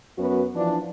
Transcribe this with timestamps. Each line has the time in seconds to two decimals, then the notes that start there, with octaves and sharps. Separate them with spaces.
0.18 F#2 B3 F#4 B4
0.56 E3 F3 D4